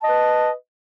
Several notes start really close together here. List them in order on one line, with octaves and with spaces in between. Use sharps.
A5 D#5 B4